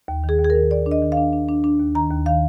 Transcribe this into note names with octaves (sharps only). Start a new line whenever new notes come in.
D#2
D#3
G#4
D#2
G#4
A#4
D#3
D#2 D5
D4
D#5
D#3
F5
D4
D4
D4
D4
D#2
D#3 A#5
D#2
D#3 F5